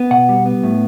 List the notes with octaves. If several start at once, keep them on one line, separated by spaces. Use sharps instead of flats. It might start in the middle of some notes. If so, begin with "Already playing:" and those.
Already playing: B3
B2 F#5
G3
B3
A2